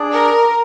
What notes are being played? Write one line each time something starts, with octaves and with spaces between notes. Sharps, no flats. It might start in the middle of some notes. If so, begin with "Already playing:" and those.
Already playing: D4 G#4 D5
A#4